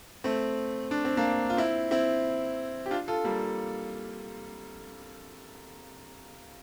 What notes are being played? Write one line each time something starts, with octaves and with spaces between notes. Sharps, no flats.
A3 C4
D4
C4
A#3 D4
F4
C4 E4
C4 E4
G4
D4 F4
F4 A4
G3 A#3